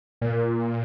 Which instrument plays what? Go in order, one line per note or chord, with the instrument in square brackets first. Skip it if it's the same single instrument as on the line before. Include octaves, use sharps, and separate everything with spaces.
[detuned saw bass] A#2